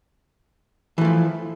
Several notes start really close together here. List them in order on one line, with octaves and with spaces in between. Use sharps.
E3 A3 F3